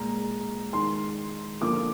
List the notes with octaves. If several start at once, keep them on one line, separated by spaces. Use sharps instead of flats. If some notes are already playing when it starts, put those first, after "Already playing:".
Already playing: A#2 G#3 A#5
D#3 G#3 C6
D3 F3 A#3 D6